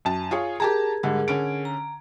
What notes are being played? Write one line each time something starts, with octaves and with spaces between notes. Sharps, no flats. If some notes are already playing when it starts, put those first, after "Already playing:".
F#2 A5
F4 G#4 C#5
G4 G#4 A#4 A5 A#5
G#2 D3 G3
D3 C#4 D7
A#5